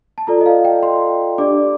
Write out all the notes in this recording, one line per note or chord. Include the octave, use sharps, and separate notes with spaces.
A5
F4 A4 D5 A#5
D#5
F5
G5
C6
D4 G4 D5 D6